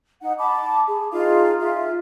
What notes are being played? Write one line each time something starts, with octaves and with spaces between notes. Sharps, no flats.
D#4 F#5
A5 B5 D6
G#4
D#4 F4 G#4 F5
F4 G#4 E5